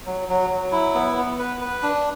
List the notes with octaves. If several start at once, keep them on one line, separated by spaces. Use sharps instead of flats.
F#3
F#3
F#3
E4
B3
B3
B4
B4
D4